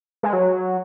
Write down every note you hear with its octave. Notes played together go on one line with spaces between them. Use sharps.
G#3
F#3